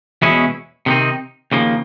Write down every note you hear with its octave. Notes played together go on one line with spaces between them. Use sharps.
E2 B2 G#3 C#4 E4
C3 D#3 G3 C4 D#4
D#2 C#3 F3 A#3